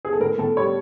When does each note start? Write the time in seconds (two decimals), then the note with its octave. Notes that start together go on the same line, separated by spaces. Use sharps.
0.05 G#4
0.13 A4
0.20 A2 A#4
0.38 A2 A4
0.56 G3 C#5